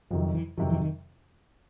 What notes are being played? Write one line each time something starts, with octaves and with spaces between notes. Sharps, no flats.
F2 C3 D#3 F3 F#3
E3
F2 C3 D#3 E3 F#3
E3
D#3